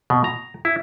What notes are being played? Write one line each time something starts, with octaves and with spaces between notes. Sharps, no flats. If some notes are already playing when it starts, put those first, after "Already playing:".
B2
A#5
E4